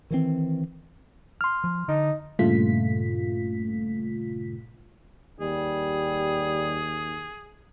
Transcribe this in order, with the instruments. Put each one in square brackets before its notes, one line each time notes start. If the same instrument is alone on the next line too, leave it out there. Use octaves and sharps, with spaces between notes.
[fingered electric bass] D#3 E3 C4
[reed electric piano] C6 F6
[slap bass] F3
[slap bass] D3 [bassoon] D#4
[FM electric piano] G2 A#2 C#3 A3 F4 B6
[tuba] D#2 [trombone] G3 [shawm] G#4